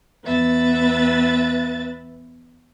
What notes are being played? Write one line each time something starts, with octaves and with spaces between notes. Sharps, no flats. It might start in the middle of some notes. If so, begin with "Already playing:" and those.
E2 B3 B4 E5 A6